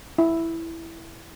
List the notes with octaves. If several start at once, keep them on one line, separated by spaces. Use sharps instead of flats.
E4